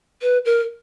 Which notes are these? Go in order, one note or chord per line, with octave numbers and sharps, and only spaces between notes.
B4
A#4